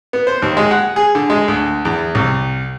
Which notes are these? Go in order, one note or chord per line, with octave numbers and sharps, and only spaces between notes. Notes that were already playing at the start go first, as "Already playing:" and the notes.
B3
C5
D#2
G#3
F#5
G#4
D3
G#3
D2
E2
C2